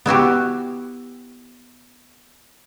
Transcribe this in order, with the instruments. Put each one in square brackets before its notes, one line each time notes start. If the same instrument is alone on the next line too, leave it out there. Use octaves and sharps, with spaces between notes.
[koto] B3 E4 F#4 G4